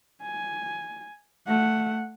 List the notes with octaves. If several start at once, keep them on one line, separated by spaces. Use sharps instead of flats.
G#5
A3 F#5